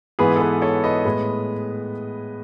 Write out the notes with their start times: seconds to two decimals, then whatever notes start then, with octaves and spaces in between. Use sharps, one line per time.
0.19 G#2 E3 B3 G#4 B4
0.36 A4
0.40 G#4 B4
0.62 A4 C#5
0.84 B4 D#5
1.05 A2 G#3 B3